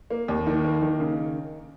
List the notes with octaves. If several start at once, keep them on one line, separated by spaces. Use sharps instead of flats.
A#3
D#2
D#3
A#3
D#3
C#3